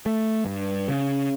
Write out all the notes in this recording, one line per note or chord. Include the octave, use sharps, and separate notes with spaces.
A3
G2
C#3